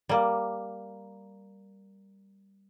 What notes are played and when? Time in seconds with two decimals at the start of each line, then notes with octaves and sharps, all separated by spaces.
0.09 G3 A#3